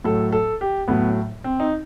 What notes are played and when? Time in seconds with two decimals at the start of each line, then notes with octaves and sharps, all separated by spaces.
0.04 A2 F#3 A4
0.32 A4
0.61 G4
0.88 A2 F#3 B3
1.44 C4
1.60 D#4